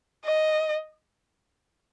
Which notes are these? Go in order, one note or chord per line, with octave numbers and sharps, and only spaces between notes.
D#5